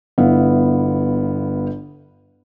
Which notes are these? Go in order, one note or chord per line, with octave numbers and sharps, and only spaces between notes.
G1 B3 E4 F5